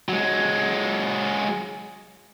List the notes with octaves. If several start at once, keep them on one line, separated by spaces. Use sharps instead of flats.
F#3 G#3